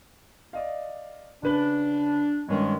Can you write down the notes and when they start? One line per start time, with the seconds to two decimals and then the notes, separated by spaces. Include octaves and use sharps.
0.53 D5 D#5 F5
1.43 C#3 D4 B4 F#7
2.49 G2 D#3 G#3 C#4